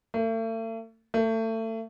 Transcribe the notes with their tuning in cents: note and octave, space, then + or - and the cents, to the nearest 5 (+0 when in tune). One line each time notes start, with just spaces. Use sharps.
A3 +40
A3 +30